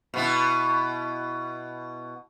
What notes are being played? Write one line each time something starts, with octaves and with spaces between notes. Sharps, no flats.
B2 B3 E4